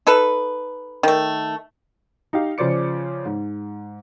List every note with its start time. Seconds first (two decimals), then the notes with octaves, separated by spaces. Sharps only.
0.07 D#4 A4 B4
1.03 D#3 A3
2.33 D#4 G4 F5
2.58 C#3 F3 C5 D5 D6 C#7
3.25 G#2